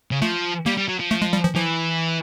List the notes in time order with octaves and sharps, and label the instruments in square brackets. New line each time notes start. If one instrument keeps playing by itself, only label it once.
[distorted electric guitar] C#3
[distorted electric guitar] F3 [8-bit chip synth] A3
[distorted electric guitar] G3 [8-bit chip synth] A#3
[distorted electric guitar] G3
F#3
F3
[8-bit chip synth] A3
G#3
G3
F3
[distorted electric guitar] E3 [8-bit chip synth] F3